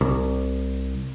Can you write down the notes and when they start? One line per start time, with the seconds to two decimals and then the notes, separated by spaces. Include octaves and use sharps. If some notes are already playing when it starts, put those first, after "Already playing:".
0.01 C2